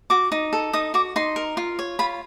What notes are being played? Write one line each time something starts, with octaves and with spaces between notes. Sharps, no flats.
F#4 D6
D#4
A4
D#4 D#6
F#4 D6
D#4 C6
A#4
F4
C#5
F4 B5